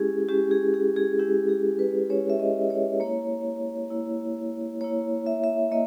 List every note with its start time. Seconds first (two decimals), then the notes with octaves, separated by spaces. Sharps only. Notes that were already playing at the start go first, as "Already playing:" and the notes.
Already playing: G#3 C#4 E4 G4 G#4
0.29 G#3 C#4 E4 G4
0.51 G#4
0.74 G#4
0.97 G#4
1.19 G#3 C#4 E4 G4
1.49 G#4
1.79 B4
2.10 G#3 C#4 E4 C#5
2.30 E5
2.40 D#5
2.70 C#5
3.00 A#3 E4 C#5
3.91 A#3 E4
4.81 A#3 E4 C#5
5.26 E5
5.44 E5
5.72 A#3 D#5